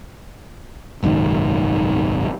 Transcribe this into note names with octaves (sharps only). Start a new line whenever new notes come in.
F#1 B1 G#2 D#3